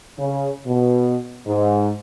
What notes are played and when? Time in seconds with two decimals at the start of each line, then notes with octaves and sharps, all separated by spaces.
0.18 C#3
0.67 B2
1.46 G#2